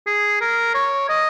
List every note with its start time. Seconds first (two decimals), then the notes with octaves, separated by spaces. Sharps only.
0.07 G#4
0.41 A#4
0.74 C#5
1.09 D#5